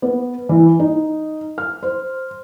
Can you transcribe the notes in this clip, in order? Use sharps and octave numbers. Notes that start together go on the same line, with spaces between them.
B3
E3
D#4
F6
C5